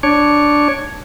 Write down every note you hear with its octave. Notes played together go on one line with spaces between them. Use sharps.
D4 C#5